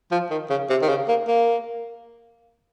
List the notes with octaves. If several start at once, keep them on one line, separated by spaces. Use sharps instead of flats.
F3
D#3
C#3
C3
D#3
C#3
A#3
A#3